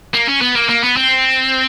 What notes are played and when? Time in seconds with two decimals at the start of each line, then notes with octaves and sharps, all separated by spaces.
0.14 A#3
0.28 C#4
0.42 B3
0.55 A#3
0.69 A#3
0.82 B3
0.97 C4